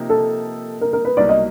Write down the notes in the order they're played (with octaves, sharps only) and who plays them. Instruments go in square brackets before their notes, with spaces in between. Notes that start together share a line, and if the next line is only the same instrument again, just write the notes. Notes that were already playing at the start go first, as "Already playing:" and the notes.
Already playing: [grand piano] C3 F3 A#3 D#4
[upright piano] A4
A#4
A#4
B4
[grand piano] C2 B2 F#3 A#3 D#4 [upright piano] D5
[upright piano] D#5